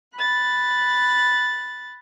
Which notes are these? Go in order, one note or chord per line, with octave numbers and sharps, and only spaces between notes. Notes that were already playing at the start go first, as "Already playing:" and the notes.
B5 F#6 A6